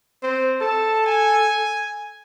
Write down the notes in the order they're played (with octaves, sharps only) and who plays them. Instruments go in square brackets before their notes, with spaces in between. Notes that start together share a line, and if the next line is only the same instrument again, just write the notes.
[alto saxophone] C4 [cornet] C5
[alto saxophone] A4 [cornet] A5
[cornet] G#5